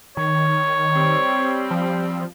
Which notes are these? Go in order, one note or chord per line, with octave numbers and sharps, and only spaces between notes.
D#3 C#5
G3 C4
F3